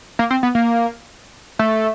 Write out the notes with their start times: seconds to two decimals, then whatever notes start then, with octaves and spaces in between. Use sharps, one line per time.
0.19 A#3
0.31 C4
0.43 B3
0.55 A#3
1.59 A3